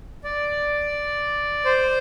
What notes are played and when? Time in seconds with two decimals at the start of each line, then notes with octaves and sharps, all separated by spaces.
0.24 D5
1.65 C5